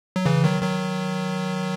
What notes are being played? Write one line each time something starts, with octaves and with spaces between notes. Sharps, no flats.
F#3
C#3 E3
D#3 F#3
D#3 F#3